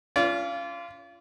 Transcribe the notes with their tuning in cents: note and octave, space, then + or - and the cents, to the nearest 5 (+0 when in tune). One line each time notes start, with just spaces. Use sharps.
C#4 +20 F4 -25 D5 -35